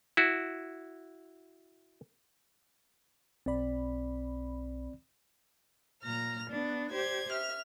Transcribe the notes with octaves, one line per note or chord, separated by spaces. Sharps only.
E4 F#4
B1 C4 D5 B5
A#2 A#5 F6
B3 D4
G4 C5 D5 G#6
E5 F6